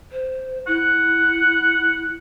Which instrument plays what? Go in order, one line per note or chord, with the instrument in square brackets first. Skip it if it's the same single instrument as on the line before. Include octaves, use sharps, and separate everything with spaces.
[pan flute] C5
[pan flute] E4 [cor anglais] F#5